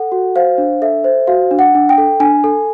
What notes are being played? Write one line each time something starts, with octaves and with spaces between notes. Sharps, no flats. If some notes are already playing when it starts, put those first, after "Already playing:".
Already playing: A4 F#5
F#4
C5 F5
D4
A4 E5
C5
F#4 F5
D4
F#5
D4
G5
A4
D4 G#5
A4